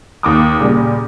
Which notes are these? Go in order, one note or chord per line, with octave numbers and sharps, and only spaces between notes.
D#2 D6 D#6
A#2 C#3 G3